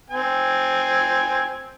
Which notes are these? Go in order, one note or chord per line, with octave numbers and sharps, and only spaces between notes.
C4 G#5